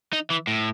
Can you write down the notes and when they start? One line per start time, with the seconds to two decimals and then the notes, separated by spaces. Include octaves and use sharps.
0.13 D#4
0.30 E3
0.47 A2